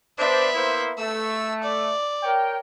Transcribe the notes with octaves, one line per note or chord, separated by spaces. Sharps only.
B3 D4 C5 E5
A#3 E4 C5
A3 E6
D5
A#4 C#5 G5